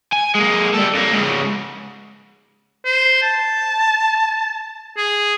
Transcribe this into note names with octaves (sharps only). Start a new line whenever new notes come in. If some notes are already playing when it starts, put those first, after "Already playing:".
G#5
G#3 A#3
G3 A4
F2 A#3
G#2 C#3
C5
A5
G#4